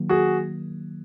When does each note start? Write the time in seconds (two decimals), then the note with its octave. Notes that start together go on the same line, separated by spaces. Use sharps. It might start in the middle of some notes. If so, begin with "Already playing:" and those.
Already playing: D#3 F#3 A#3
0.09 F#4 G#4